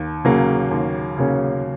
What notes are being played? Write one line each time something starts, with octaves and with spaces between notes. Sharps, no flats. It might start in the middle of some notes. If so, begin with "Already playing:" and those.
Already playing: D#2
C#3 F#3 A#3 C#4
D#2
C#3 F#3 A#3 C#4